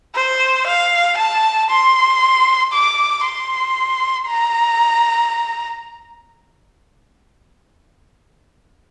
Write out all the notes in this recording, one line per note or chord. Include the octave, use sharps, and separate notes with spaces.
C5
F5
A5
C6
D6
C6
A#5